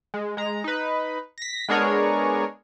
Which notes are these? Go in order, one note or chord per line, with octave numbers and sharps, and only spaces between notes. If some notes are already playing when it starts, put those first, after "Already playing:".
G#3
G#3 A#5
D#4 B4
A#6 B6
G#3 B3 D4 G#4 A#4 C#5